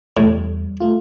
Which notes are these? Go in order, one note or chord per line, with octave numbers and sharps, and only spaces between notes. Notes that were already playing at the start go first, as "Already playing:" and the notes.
E2 A2 G3
A3 F4